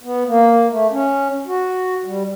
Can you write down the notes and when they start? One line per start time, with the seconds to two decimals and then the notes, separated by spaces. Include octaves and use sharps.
0.03 B3
0.27 A#3
0.70 A3
0.91 C#4
1.47 F#4
2.05 G3